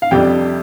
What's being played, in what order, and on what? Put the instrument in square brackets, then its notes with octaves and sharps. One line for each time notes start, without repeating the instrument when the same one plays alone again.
[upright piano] F5
F2 C3 G3 D4 G4 G5